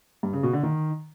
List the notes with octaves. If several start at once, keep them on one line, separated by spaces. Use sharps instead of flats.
G2
C#3
B2
D3
D#3